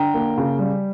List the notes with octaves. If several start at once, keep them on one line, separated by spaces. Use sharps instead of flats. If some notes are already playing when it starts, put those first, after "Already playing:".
Already playing: D3 G5 A#5
A#3
C#3
G3